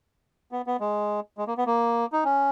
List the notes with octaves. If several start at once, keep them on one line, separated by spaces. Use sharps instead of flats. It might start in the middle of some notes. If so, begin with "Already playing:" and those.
B3
B3
G#3
G#3
A#3
B3
A#3
D#4
C#4